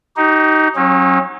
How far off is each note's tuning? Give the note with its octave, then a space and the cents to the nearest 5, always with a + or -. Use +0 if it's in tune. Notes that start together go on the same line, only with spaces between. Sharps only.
D#4 +5 G4 -35
F#3 -15 C#4 -40